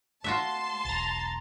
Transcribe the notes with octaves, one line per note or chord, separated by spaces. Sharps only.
A3 F4 F#4 E5 A5 C6
E1 B1 A#5 A6